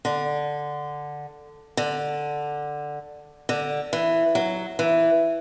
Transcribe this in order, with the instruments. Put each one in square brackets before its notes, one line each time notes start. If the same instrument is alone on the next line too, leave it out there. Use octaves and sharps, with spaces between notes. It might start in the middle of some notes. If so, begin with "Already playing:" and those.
[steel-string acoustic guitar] D3
D3
D3
E3
F#3
E3